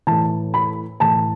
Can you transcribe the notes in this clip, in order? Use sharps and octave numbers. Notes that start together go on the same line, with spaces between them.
A2 E3 A5
B5
A2 E3 A5